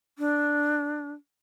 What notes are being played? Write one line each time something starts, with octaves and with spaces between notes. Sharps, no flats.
D4